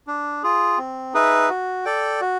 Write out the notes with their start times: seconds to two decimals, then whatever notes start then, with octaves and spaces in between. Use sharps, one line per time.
0.07 D4
0.43 F4 G#4
0.78 C4
1.14 D#4 G#4 B4 E5
1.49 F#4
1.85 A4 D5 G5
2.21 F#4